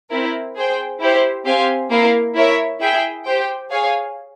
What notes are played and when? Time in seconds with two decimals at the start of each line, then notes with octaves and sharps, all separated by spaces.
0.10 C4 E4 A#4
0.56 G#4 C5 G5
1.00 E4 G4 C5
1.46 C4 G4 C5 F5 G#5
1.90 A#3 E4 A#4 F5
2.35 E4 A#4 C#5 E5
2.80 E4 G#4 E5 G5
3.25 G4 C5 G5
3.70 G#4 C#5 F5 G#5